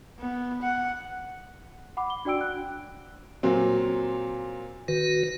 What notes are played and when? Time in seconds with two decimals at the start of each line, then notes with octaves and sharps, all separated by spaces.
0.20 B3
0.62 F#5
1.97 F#5 B5 D6
2.10 G7
2.25 D4 F#4 D5 G5 E6 D7
2.41 F#6
3.43 A#2 F#3 C4
4.88 D#3 F#4 B4